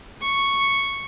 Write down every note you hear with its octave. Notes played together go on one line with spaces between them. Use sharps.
C#6